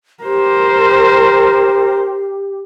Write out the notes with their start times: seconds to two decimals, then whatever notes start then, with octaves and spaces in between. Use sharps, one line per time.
0.23 G4 A#4 C5